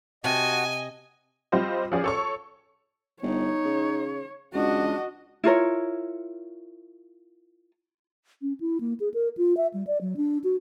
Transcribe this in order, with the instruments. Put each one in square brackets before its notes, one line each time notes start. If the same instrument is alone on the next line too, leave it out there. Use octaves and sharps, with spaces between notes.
[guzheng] C3 [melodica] F#4 F#5 A5 [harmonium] D#5 [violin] G#5
[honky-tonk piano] G3 C4 F4 G4 C5 D#5
F3 C#4 F4 G#4 C5 D5
A4 C#5 C#6
[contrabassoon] G1 [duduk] D#4 [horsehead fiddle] C#5
[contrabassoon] C#3
[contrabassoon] C#2 [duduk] D4 [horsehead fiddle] F#4 D#5
[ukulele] E4 F4 A#4 C#5
[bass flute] C#4
E4
A#3
G#4
A#4
F4
E5
G3
D5
F#3
D4
F#4